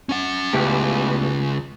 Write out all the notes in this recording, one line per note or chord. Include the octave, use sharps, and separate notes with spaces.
C#4 F#5
C#2 A2 B3 G4